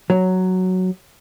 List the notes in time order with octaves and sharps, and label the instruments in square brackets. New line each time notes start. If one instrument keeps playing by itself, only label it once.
[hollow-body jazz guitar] F#3